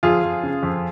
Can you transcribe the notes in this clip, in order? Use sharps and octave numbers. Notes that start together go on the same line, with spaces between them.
F2 F4 G#4
F2
C#3
F2